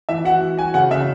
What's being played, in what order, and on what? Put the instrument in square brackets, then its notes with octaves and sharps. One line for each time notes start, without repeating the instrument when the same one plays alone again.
[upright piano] E3 [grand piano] E5
[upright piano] F#4 [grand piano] F#5
[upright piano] E3
[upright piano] F#4 [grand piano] G#5
[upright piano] C#3 [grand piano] F#5
[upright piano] C#3 [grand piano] E5